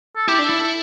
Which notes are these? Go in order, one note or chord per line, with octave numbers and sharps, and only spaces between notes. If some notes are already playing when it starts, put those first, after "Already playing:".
A4
E4 G4
D4
E4 A4
A4